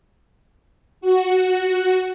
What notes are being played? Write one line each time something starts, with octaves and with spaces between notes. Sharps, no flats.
F#4